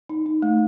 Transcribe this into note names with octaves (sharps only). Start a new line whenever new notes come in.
D#4
D#4
A3